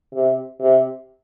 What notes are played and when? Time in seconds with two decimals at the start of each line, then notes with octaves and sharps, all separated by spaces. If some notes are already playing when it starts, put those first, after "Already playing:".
0.14 C3
0.60 C3